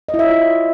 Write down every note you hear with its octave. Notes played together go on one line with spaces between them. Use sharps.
D#5
E4
E5
C#5
F4